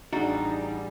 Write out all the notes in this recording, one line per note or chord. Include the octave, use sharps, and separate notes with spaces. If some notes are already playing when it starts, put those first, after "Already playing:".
A1 G3 D4 D#4 F#4 G#4 A6